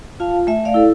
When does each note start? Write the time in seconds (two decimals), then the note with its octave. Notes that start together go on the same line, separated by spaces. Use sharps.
0.20 F4 F5 A5
0.47 A3 E5 G#5
0.65 D5 F5
0.74 E4 A4